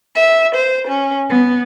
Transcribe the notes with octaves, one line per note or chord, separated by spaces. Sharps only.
E5
C5
C#4
B3